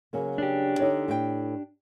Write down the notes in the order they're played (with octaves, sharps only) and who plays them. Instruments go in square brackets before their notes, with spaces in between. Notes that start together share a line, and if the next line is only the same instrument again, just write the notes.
[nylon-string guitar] C#3 F#3 A#3
[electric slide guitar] D4 G4
[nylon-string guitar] D3 D#4 C#5
A2 G5